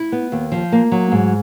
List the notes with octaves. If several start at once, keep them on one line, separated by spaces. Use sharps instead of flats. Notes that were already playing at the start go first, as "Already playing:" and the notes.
Already playing: E4
B3
D#2
F3
A#3
F#3
G#2